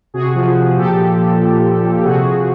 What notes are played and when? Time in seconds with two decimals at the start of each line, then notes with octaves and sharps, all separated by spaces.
0.14 C3 F#4 G#4
0.35 F3
0.56 F3
0.77 A#2 G4 A4
0.98 F3
1.19 F3
1.41 A#2
1.62 F3
1.83 F3
2.03 C3 F#4 G#4
2.25 F3